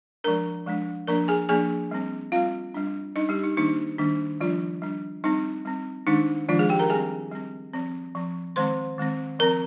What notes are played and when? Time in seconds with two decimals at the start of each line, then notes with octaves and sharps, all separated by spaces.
0.24 F3 G#3 D4 A#4 A#5
0.66 F3 G#3 D4
1.07 F3 A#3 D4 A#4 A#5
1.28 G#4 G#5
1.49 F3 A#3 D4 G#4 G#5
1.91 G3 C4
2.32 G3 C4 F4 F5
2.74 G3 D4
3.16 G3 D4 D#4 D#5
3.29 G3 G4
3.43 D#4
3.57 D#3 G3 A#3 D4 D#4
3.99 D#3 G3 A#3 D4
4.40 F3 G3 D4 F4
4.82 G3 D4
5.24 G3 C4 D#4
5.65 G3 C4
6.07 D#3 G#3 D4 D#4
6.48 D#3 F3 G#3 D4 F4
6.59 G#3 G#4
6.69 G4 G5
6.79 A#4 A#5
6.90 G3 C4 G#4 G#5
7.31 G3 C4
7.74 F3 C4
8.15 F3 C4
8.56 D#3 G#3 C4 C5 C6
8.98 D#3 G#3 C4
9.39 F3 C4 A#4 A#5